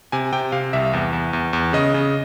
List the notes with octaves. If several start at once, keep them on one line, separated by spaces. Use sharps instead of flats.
C3 G#5
C3 G5
C3 F5
C2 E5
E2
E2
E2
E2
C#3 D#5
C#3